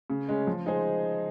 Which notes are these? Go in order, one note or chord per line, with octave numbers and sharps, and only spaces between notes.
C#3
G#3 C#4
F3
G#3 D#4 G#4 C5